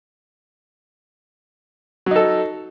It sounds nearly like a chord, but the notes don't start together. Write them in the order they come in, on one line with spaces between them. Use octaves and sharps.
F#3 D#4 A4